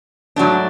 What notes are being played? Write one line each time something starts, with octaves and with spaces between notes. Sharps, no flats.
G#2 F#3 A3 D4